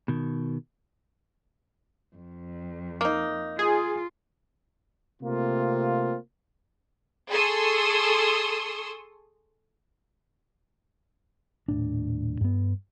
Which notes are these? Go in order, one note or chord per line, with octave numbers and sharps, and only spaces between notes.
B2 D#3
F2
A#3 D#4
F4 G#4
C3 A3 A#3 C4 F4
G#4 A4 C6 C#6 D#6 E6
D#1 A2 D4
G2 B3